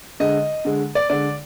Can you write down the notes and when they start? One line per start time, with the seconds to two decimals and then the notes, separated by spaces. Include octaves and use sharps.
0.20 D3 G#3 D#5
0.65 D3 G#3
0.95 D5
1.10 D3 G#3 D5